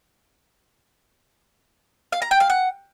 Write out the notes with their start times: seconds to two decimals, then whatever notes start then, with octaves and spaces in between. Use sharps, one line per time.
2.12 F5
2.22 A#5
2.31 G5
2.40 F5
2.50 F#5